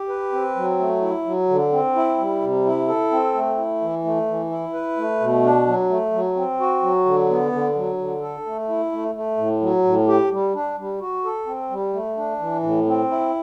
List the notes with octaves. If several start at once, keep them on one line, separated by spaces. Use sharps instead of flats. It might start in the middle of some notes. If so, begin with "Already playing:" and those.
Already playing: G4
B4
C4
F#3
A3
E4
F#3
D3
C4
E4
G3
C3
E4
A4
C4
A3
E4
E3
A3
E3
E4
B4
A3
B2
D4
F#3
A3
F#3
C4
F#4
F#3
D3
B3
D3
F#3
D3
A4
A3
E4
A3
A3
A2
F#3
A2
G4
G3
D4
G3
F#4
A4
C4
G3
A3
D4
E3
A2
C4
E4